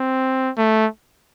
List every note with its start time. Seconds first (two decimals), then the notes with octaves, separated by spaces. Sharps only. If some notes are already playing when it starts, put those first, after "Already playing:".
Already playing: C4
0.57 A3